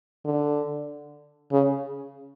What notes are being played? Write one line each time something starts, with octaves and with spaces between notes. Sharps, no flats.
D3
C#3